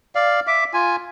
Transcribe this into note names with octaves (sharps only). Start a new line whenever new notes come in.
D5 F5
E5 D6
F4 G#5